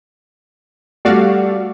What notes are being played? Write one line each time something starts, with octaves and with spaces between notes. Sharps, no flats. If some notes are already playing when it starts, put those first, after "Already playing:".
G3 A3 F#4 D5 F5